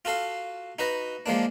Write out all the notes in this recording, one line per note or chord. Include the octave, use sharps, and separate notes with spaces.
F4 F#4 A4 F5
D#4 F#4 B4 D#5
F3 G#3 A#3 D4